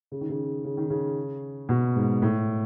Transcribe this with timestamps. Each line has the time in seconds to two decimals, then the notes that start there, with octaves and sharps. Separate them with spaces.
0.12 C#3
0.21 D#3
0.29 C#3
0.64 C#3
0.77 D#3
0.90 C#3
1.69 B2
1.96 G#2
2.22 A2